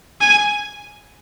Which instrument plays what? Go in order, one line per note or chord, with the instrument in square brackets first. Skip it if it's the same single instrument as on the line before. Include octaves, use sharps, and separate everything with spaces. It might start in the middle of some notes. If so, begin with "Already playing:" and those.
[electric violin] G#5